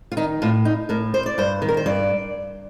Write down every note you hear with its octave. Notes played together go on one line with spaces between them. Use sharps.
F4
D#3 D#4
A2 F4
D#4
A2 A#4
C5
D5
G2 C5
D#3
A#4
C5
G2 D5